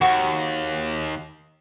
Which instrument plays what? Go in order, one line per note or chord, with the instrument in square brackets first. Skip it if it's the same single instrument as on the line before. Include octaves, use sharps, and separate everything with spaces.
[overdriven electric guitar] D#2 [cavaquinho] F#4 C#6